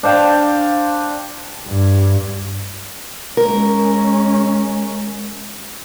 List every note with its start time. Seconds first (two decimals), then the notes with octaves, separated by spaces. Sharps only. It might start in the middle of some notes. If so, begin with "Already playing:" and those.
0.03 D4 C5 F5 G5
1.68 G2
3.37 G#3 C#4 A#4